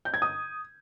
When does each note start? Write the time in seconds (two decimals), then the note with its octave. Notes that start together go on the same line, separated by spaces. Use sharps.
0.05 G6
0.14 G#6
0.22 D#6